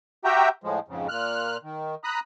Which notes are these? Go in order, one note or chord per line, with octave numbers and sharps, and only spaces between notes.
F#4 G4 E5 G5 A#5
A2 F3 G#3
F2 G#2 C#3
A#2 F6 F#6
D#3
A#5 B5 D#6 F#6